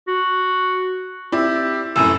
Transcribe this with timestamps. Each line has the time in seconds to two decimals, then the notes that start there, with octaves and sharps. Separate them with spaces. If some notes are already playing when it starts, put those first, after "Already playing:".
0.08 F#4
1.32 C4 E4 G4 D5
1.96 F1 F#2 A2 E6